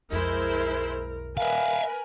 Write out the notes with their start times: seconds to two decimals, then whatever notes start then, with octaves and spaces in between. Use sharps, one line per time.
0.11 B1 F2 G#3 E4 A#4 C5
1.37 A#4 B4 E5 F5 G#5